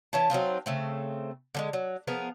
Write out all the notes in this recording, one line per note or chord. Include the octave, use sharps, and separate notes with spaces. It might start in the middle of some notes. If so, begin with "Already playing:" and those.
E3 C#4 A5
F#3 C4 D#4 F4
C#3 A3 C4
D3 F#3 G#3
F#3
F3 B3 G#4 A#4